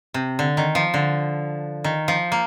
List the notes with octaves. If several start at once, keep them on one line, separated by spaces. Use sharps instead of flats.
C3
D3
D#3
F3
D3
D#3
F3
A#3